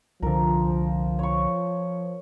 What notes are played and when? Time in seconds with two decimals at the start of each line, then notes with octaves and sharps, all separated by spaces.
0.22 C2 D3 F3 A#4
1.19 C#5 C#6